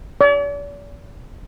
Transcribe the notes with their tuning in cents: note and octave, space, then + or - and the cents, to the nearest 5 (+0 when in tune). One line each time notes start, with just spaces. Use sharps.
D5 -45